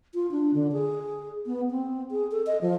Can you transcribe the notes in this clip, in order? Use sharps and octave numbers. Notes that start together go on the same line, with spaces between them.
F4
D4
D3
G#4
B3
C4
G#4
A4
D#5
F3